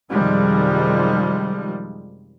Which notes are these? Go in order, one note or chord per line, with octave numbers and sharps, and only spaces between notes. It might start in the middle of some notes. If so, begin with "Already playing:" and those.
F#2 C3 D#3 F3 G3 G#3